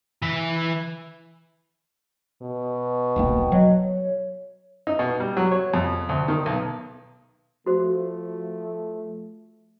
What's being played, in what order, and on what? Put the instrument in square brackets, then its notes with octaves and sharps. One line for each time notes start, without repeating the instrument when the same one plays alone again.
[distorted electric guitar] E3 E5
[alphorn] B2
[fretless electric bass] D#1 B1 A#3 [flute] G5
[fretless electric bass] F#3 [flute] D#5
[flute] C#5
[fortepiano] D#4
B2
G3
F#3
C#5
F2
D2
D#3
B1
[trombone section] F3 A3 [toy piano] F#4 C5